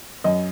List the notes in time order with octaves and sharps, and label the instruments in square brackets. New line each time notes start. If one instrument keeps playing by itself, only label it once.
[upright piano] F#2 D#5